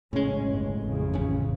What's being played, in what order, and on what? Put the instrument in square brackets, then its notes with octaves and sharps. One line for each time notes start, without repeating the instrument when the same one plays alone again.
[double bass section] A#1 C#3 C#4 [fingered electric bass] A2 G#3
[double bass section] G1 C#2
A1 F2 C#3
[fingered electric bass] G1 C#4